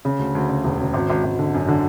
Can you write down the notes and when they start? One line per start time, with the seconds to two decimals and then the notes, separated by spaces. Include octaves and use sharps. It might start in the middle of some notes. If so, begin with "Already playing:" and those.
0.05 C#3
0.19 D2
0.35 D2
0.50 C#3
0.64 E1
0.79 C#3
0.94 G#1
1.10 G#1
1.23 G#1
1.39 D3
1.54 F#2
1.68 D3